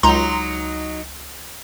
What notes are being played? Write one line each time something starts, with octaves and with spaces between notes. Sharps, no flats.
C#2 F#3 D#4 A#5 C6